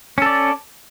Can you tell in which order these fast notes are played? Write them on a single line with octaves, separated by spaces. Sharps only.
C#4 A4 D5